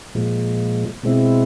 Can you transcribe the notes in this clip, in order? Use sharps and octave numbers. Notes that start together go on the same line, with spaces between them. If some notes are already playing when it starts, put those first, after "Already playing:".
A#2 F3 G#3
B2 G#3 C4 E4